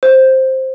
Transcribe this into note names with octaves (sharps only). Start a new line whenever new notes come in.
C5